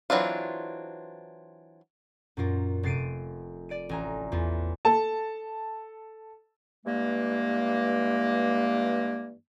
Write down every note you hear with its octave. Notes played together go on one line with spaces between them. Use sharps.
E3 F#3 C4 D4 F4
F#2 A#2 F4 A#4
F1 A6 C7 D7 D#7
D5 D7 D#7
A1 G#5 A#5
E2 F4
A4 A5
G2 E3 G#3 A#3